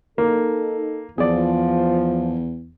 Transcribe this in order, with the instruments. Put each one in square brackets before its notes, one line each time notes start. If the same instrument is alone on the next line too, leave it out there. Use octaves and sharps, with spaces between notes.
[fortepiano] A#3 [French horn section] D#4 A4
[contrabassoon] E2 [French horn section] F3 [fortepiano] G#4 D5